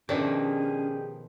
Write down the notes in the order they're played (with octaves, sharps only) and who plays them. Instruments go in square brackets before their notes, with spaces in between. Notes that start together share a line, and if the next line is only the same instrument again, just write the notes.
[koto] B2 D#3 F3 [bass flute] C#4 [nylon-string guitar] D4 D5 [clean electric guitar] G4 G#4